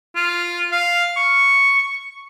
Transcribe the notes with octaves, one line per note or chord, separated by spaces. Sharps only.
F4
F5
C#6